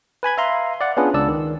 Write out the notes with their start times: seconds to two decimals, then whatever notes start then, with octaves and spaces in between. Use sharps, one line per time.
0.23 B4 G#5 B5 G#6
0.38 E5 F5 A#5 C6
0.81 D5 F#5
0.97 B3 C#4 D4 F4 G#4 B4
1.14 C#2 D4 D5 E6
1.28 D#3